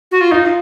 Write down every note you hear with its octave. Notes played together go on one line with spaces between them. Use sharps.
F#4
F4
D#4 F4